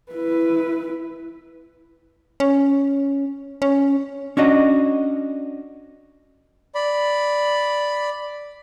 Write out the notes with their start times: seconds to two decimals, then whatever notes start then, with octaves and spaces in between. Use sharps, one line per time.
0.12 E4 B4
2.40 C#4
3.62 C#4
4.37 C#4 D4 F#4 D#5
6.75 D5 B5